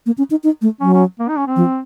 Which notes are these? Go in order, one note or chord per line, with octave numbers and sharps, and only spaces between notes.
A#3
C#4
D#4
D#4
A3
F#3 C#4
C#4
A#3
D#4
C#4
C4
F3